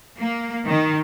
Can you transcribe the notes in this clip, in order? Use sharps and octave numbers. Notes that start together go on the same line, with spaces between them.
A#3
D#3